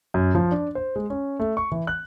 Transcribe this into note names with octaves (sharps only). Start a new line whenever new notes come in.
F#2
F3
D4
C5
G#3
C#4
A3
C#6
E3
F#6